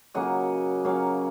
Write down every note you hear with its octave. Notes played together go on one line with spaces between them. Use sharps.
C#3 F#3 A#3 D#5 F#5
C#3 F#3 A#3 C#5 F5